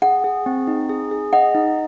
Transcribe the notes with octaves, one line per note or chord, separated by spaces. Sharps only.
G#4 F#5
G#4
C4
D#4
G#4
G#4
D#5 F#5
D#4